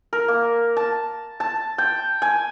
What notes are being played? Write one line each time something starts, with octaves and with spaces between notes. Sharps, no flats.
A#4
A#3
A5
A5
G5
G#5